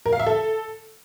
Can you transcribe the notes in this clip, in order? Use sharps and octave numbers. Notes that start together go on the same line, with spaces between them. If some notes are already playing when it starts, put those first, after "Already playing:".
A#4
F5
E5
A4